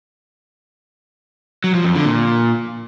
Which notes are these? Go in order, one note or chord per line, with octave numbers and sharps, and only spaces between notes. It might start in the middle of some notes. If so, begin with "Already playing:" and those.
F#3
F3
F2
D3
A#2